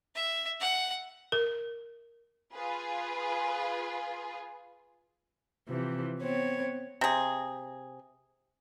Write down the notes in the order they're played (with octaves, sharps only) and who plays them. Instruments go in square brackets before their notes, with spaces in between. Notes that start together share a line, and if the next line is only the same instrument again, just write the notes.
[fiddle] E5
F#5
[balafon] A#4
[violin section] F4 G#4 B4
[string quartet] C3 E3 F3
B3 C4 C#5
[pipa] C3 G#4